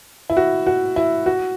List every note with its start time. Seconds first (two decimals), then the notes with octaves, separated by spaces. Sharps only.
0.30 E4
0.37 F#4
0.67 F#4
0.96 E4
1.26 F#4